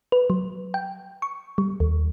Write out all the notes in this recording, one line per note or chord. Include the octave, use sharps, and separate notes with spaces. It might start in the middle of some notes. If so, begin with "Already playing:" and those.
B4
F#3
G5
C#6
G3
D#2